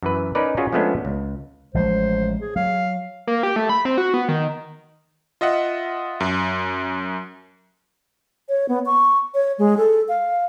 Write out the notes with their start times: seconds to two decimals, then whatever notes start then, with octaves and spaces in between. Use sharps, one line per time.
0.03 F#2 E3 B4
0.35 C#4 D#4 A#4 B4 D5
0.57 C#4 F4 F#4 G#4
0.73 F3 G#3 A3 B3 C#4 D4
1.05 C#2
1.74 A1 F3 G#3 C5
2.41 G#4
2.56 F#3 F5
3.28 A#3
3.43 G4
3.56 A3
3.69 B5
3.85 C4
3.98 F#4
4.14 B3
4.29 D#3
5.41 F4 D#5 E5 F#5
6.20 F#2
8.49 C#5
8.69 B3
8.86 C#6
9.34 C#5
9.58 G#3
9.77 A4
10.08 F5